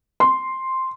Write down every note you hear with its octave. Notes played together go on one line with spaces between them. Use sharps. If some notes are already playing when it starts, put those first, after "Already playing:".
C6